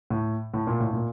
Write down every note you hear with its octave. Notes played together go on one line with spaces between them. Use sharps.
A2
A2
A#2
A2
A#2